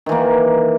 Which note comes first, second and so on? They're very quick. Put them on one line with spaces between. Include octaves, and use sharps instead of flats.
D#3 E3 A#3